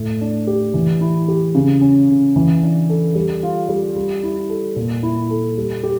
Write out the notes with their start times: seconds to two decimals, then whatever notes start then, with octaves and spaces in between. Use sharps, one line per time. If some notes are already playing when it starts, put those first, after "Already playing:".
Already playing: A2
0.21 D4
0.47 G4
0.74 E3
1.01 E4
1.28 G4
1.55 C#3
1.81 C#4
2.09 C#3
2.36 E3
2.63 D4
2.89 A4
3.15 G3
3.43 F4
3.69 G3
3.96 G3
4.23 E4
4.50 A4
4.76 A#2
5.03 E4
5.30 A4
5.58 G3
5.83 G4